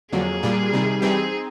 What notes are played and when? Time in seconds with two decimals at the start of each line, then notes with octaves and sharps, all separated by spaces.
0.12 F2 D3 F#3 A#3 G#4
0.43 A#2 G3 A#3 D4
0.73 C3 D#3 G3
1.02 E3 G3 C4 D#4 G4 G#4